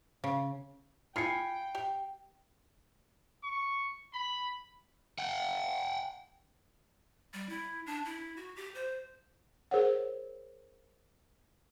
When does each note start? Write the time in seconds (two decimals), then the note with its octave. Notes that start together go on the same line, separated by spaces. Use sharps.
0.24 C#3
1.16 F4 G5 G#5 B5 C7 C#7
1.75 G4
3.43 C#6
4.13 B5
5.19 F#5 G5
7.34 G3
7.49 E4
7.86 D4
8.05 E4
8.37 F#4
8.56 G4
8.75 C5
9.71 G#4 A#4 C5 C#5 F#5